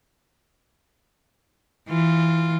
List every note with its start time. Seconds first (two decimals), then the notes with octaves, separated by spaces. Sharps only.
1.89 E3 F4